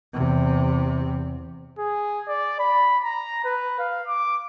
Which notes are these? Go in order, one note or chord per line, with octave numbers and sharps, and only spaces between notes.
E2 C3
G#4
D5
B5
A#5
B4
F5
D6